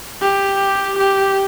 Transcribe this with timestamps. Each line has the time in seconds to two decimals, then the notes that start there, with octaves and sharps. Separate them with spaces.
0.22 G4
0.98 G4